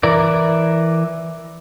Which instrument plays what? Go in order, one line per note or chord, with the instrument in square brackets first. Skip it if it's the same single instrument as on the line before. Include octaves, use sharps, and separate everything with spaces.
[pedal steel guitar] E3 E4 A#4 D5